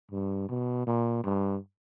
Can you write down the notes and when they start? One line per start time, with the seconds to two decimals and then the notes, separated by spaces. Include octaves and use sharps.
0.11 G2
0.49 B2
0.87 A#2
1.23 G2